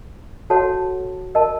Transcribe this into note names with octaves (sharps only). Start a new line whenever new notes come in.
F#4 A4 C#5 F#5 A5
A#4 D#5 A5